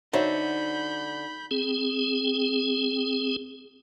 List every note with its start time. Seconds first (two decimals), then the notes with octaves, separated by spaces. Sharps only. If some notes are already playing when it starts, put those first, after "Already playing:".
0.13 D3 D#4 F#4 C5 C#5 E5 B5 G6
1.51 C4 G#4